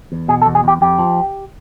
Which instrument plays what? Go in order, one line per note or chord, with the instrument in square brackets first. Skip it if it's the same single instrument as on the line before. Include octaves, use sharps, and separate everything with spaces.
[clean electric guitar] E2
B2 G#4
A4
E2
G#4
E2 G4
F2 G4
F3